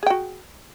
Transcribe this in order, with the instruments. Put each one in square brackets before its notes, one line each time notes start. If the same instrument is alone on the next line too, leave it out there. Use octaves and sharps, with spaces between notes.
[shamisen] G#4
G5
F#4